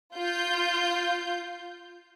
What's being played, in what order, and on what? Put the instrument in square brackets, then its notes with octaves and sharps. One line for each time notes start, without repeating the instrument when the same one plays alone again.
[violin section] F4 G6